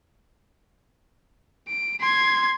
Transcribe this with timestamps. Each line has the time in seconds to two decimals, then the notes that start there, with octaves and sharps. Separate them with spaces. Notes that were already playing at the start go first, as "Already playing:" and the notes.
1.68 D7
2.00 C6 G#6